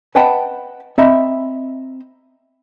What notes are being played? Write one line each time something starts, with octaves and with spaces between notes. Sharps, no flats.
B4 D#5 F#5 G5 A5 B5
C4 D#5 E5 A#5 B5